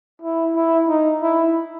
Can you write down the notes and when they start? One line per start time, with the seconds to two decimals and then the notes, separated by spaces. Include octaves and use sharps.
0.22 E4
0.55 E4
0.88 D#4
1.22 E4